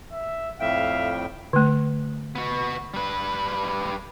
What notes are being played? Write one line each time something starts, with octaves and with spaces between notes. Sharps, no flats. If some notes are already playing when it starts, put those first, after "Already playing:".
E5
F2 A2 E5 F5 G5
D3 A3
B3 F#4
G3 B4